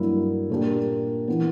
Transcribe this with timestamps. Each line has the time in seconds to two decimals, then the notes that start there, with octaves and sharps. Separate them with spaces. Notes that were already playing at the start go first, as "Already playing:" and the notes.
Already playing: G2 F#3 A#3 E4
0.50 A#2 A#3 D4 G4
1.28 E3 B3